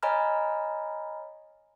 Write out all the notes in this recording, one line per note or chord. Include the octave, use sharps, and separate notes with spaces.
C#5 D#5 G#5 A#5 B5 F6